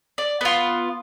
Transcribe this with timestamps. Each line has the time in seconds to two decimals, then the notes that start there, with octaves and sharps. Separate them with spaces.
0.18 D5
0.41 B3 F4